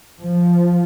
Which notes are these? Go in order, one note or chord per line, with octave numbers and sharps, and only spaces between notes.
F3